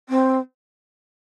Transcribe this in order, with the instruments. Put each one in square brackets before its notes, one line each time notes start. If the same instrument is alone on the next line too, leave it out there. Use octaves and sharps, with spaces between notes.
[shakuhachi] C4